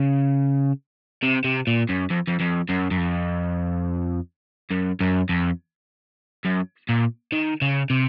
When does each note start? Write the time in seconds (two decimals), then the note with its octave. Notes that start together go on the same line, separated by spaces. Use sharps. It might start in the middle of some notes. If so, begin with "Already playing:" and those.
Already playing: C#3
1.23 C3
1.45 C3
1.67 A#2
1.89 F#2
2.10 F2
2.27 F2
2.40 F2
2.69 F#2
2.91 F#2
2.97 F2
4.71 F#2
5.01 F#2
5.29 F2
6.45 F#2
6.89 A#2
7.32 D#3
7.62 C#3
7.90 C3